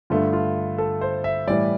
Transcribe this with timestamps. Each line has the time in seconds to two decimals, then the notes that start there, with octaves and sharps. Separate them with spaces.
0.10 G2 D3 A3 F4
0.33 F4
0.78 A4
1.01 C5
1.24 E5
1.47 A2 E3 G3 D5